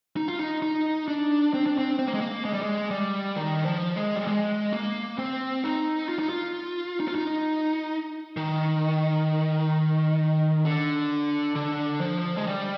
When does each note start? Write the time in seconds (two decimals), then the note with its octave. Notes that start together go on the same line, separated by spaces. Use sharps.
0.17 D#4
0.28 F4
0.38 D#4
0.62 D#4
1.08 D4
1.54 C4
1.66 D4
1.78 C4
1.99 C4
2.07 A#3
2.14 G#3
2.21 A#3
2.45 G#3
2.53 G3
2.63 G#3
2.91 G3
3.36 D#3
3.66 F3
3.96 G#3
4.16 G3
4.27 G#3
4.73 A#3
5.19 C4
5.64 D#4
6.09 F4
6.19 D#4
6.29 F4
7.00 D#4
7.08 F4
7.15 D#4
8.37 D#3
10.65 D3
11.55 D3
12.01 F3
12.37 G#3
12.47 G3